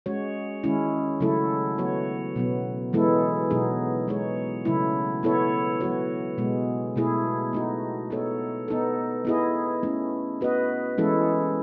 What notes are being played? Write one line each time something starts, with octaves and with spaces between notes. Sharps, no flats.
G#3 C#4 F#4 C#5
D#3 G#3 C#4 E4
C#3 F#3 A3 E4 A4
F#3 B3 F#4 C#5
B2 F#3 B3
E3 G#3 B3 E4 A4
B2 F#3 B3 D#4 G#4
G#3 D#4 G#4 C#5
C#3 F#3 A3 E4
B3 E4 A4 C#5
F#3 B3 F#4 C#5
B2 G#3 B3
B2 A3 E4 G#4
A3 D#4 F#4
B3 D#4 A4 C#5
B3 D#4 A4
B3 E4 G#4 D#5
A3 C#4 E4
B3 F#4 B4 D#5
E3 G#3 C#4 E4 A4